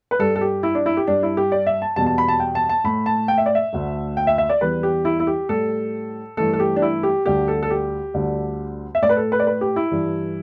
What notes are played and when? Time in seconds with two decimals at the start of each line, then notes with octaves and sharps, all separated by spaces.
0.11 B4
0.19 G2 G3 A4
0.36 A4
0.41 G4
0.63 E4
0.75 D4
0.86 E4
0.97 G4
1.07 G2 G3 D4
1.23 E4
1.37 G4
1.52 D5
1.67 E5
1.82 A5
1.96 E2 B2 G3 A5
2.06 A5
2.18 B5
2.28 A5
2.40 G5
2.55 A5
2.69 A5
2.84 A2 A3 B5
3.06 A5
3.28 G5
3.38 E5
3.46 D5
3.55 E5
3.73 D2 D3 A3
4.17 G5
4.27 E5
4.38 E5
4.50 D5
4.61 E2 E3 G3 B4
4.83 G4
5.05 E4
5.20 E4
5.27 G4
5.49 A2 G3 A4
6.37 G2 E3 A3 A4
6.53 A4
6.60 G4
6.76 D4
6.82 E4
7.03 G4
7.26 D2 D3 G3 G4
7.48 A4
7.63 A4
7.70 G4
8.14 D2 D3 G3
8.95 E5
9.02 A2 A3 D5
9.09 B4
9.17 A4
9.32 B4
9.40 D5
9.47 B4
9.61 G4
9.76 E4
9.91 G2 E3 G3